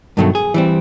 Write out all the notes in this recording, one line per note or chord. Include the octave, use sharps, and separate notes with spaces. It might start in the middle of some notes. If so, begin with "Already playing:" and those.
G2 B2 D#3 F#3 G#3 A3
G#4
E3 G3 C4